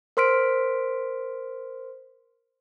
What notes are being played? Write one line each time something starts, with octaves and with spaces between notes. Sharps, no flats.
A#4 C5 C6 F6 B6 D7